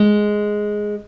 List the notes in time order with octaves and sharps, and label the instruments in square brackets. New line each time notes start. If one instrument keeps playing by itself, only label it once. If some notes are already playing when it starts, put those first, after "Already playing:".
Already playing: [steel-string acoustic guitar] G#3